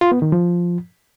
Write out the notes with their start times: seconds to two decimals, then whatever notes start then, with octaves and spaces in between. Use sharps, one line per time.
0.01 F4
0.12 B3
0.22 D#3
0.32 F3